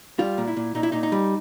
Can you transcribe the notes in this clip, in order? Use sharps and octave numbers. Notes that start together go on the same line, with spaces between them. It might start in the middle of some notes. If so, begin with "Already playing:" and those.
G3 F4
A#2
E4
A#2
A#2 D#4
E4
A#2 D#4
D#4
G3